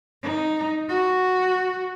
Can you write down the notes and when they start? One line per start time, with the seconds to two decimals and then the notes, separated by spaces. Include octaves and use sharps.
0.23 D#4
0.89 F#4